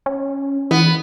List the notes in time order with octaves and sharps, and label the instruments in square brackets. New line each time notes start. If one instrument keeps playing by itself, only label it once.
[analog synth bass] C#4
[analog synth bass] E3 [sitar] B3